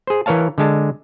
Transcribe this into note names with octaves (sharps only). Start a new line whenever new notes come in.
G#4 C5
E3 A#4 C#5 F5 A5
D3 G#3 A5